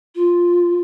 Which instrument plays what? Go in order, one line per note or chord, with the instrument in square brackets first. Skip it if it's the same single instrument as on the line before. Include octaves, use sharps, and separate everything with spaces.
[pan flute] F4